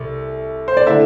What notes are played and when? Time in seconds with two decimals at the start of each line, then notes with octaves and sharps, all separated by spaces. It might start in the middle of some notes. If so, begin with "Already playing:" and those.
Already playing: C2 A3
0.68 C5
0.77 D5
0.87 D3 A3 D4 E4 E5